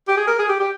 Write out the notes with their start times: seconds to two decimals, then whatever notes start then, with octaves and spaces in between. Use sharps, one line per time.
0.08 G4
0.17 G#4
0.27 A#4
0.39 G#4
0.49 G4
0.60 G4